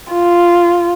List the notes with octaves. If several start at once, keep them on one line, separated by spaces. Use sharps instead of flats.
F4